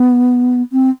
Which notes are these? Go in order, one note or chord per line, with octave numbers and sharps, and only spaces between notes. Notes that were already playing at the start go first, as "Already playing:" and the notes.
Already playing: B3
C4